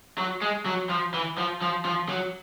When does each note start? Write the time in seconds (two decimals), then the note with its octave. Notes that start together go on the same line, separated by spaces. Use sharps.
0.18 F#3
0.41 G#3
0.66 F#3
0.90 F3
1.14 E3
1.38 F3
1.61 F3
1.85 F3
2.09 F#3